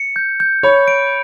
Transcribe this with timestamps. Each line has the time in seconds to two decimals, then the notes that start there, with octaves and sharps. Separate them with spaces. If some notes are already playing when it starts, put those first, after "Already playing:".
Already playing: C#7
0.16 G6
0.40 G6
0.63 C#5 B5
0.88 D7